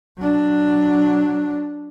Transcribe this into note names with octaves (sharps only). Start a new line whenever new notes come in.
F#3 D4